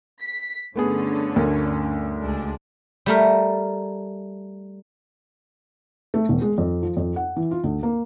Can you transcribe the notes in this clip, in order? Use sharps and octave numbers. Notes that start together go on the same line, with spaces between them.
B6
G2 D3 A3 B3 C#4 G#4
D2 A#4
C#2 G#3 D4
G3 A3 A#4
A3
E1
G#3
F2
F3
F2
F#5
E3
F4
D2
A#3